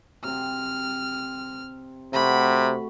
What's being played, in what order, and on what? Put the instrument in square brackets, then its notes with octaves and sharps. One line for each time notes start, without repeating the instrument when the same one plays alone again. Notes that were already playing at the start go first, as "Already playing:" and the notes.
[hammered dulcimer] C3 C4 [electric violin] F6
[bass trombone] C3 [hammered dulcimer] A3 F#4 [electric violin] B5